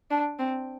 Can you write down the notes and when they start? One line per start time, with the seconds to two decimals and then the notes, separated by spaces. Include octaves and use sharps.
0.11 D4
0.39 C4